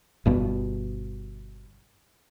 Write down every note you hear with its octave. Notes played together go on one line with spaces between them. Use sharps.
G1 G2 B2